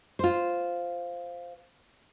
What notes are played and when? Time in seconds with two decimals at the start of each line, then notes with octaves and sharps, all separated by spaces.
0.19 F4 C5